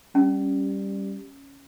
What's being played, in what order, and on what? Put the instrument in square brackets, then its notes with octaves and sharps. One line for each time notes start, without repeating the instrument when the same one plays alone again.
[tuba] G3 [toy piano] C#4